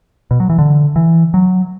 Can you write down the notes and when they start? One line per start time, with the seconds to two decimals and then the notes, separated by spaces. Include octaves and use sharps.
0.31 B2
0.40 F#3
0.50 E3
0.59 D3
0.96 E3
1.34 F#3